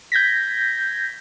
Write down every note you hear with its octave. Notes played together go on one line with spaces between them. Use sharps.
G6 G#6 A#6 B6